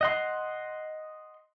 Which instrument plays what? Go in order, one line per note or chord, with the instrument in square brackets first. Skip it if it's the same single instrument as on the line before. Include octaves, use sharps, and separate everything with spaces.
[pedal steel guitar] D#5 F#5 C6